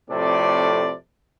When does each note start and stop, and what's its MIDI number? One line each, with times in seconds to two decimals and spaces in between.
0.11 0.94 41
0.11 0.94 45
0.11 0.94 48
0.11 0.94 69
0.11 0.94 74